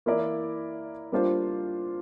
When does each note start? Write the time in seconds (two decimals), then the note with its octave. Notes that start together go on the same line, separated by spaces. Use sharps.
0.06 E3 A#3 E4 A#4 D5
1.12 G3 A#3 D4 F4 C5